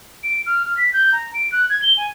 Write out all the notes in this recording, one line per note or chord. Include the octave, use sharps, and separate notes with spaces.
D7
F6
F6
B6
G6
A#5
D7
F#6
G#6
G7
G#5